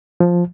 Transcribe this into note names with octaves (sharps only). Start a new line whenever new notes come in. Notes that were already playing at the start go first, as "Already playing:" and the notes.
F3